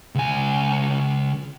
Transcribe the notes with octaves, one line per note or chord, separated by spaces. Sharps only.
C#2 G#5